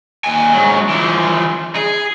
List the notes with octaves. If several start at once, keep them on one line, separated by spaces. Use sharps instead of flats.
D#2 G#5
G#2 F#3
E3 F3
G#4